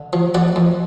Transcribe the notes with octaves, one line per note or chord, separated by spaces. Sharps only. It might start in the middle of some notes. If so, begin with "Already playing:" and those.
Already playing: D3
F3
F2 D5 F#5
F2